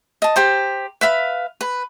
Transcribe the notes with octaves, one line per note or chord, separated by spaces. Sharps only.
D#5 A5
G4 C5 A#5
B4 E5 F5
B4